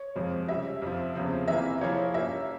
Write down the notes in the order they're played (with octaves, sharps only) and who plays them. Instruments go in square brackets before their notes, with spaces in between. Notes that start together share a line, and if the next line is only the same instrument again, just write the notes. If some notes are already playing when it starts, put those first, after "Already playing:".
Already playing: [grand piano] C#5
[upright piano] F2 C3 F3 G#3 C4
[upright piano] C#3 G3 C#4 [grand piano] E5
[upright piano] F2 C3 F3
E2 C#3 F3 C4
[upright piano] C3 E3 A#3 [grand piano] E5
[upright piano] F3 A#3 E4 G#4 [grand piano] C#5
[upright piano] G2 G3 A#3 C#4 [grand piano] E5